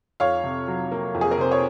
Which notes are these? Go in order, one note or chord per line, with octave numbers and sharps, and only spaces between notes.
F2 C#5 F5
C3
F#3
A#3
F2
G#4
A#4
C3 C5
C#5